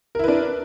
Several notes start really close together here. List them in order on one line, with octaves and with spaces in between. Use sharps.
A#4 E4 B4 D4